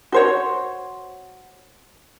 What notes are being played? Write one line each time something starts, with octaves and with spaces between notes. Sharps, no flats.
F#4 C5 C#5